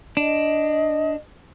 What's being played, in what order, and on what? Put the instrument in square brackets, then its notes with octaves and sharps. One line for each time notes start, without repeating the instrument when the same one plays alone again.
[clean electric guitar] D4 [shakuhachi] D#5